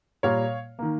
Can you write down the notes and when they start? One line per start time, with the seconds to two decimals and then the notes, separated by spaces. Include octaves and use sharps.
0.23 A#2 G3 A#3 C#5 F5
0.79 D#3 A#3